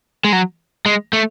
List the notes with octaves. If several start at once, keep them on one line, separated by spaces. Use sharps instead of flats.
G#3
F#3
G#3
A3